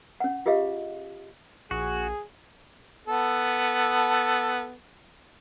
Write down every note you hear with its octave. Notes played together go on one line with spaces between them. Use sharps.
C#4 F#5
F4 G4 G#4 D#5 F5
A#1 F#4 G#4
B3 A4